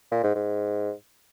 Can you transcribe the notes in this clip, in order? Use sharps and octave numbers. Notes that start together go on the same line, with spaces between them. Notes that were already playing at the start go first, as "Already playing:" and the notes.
A#2
G#2
G#2